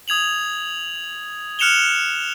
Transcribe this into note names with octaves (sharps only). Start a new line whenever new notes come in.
D#6 G#6 F7 F#7
F6 F#6 C#7 E7 F7 G7